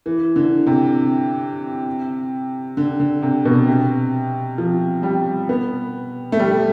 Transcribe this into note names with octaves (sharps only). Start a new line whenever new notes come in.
E3
D3
C3
D3
D3
C3
B2
C3
F3
G3
B3
A3
G3